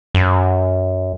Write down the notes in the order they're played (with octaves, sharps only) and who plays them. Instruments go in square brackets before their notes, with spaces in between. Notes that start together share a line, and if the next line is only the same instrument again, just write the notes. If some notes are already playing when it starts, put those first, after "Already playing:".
[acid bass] F#2